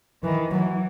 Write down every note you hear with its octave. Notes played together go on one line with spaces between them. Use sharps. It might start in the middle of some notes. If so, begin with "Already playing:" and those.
D#3 E3
E3 F#3